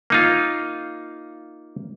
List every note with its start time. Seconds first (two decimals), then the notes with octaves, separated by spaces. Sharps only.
0.10 A#3 D#4 F4